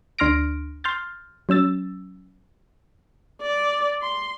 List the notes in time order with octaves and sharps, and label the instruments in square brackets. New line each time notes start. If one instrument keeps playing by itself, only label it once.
[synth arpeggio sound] D2 D4 C6 F6 A#6 D7
C6 F6 G6 A6
F#3 C#4 E6 A6
[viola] D5
C6